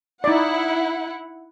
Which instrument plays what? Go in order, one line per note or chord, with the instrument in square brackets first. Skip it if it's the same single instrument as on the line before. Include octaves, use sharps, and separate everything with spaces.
[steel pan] D#4 D5 [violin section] E4 F#5